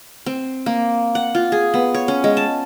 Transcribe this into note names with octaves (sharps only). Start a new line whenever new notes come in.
C4
A#3
F#5
F4
G#4
B3
C#5
C#4
G#3
A5